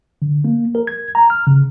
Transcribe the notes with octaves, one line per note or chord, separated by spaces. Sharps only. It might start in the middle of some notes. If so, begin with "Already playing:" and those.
D3
A#3
A#4
G#6
A#5
F6
C#3